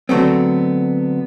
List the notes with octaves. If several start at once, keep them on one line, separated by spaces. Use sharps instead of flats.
D3 F#3 A3 B3 C4